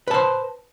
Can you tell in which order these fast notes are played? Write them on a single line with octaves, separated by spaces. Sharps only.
B4 A5 C5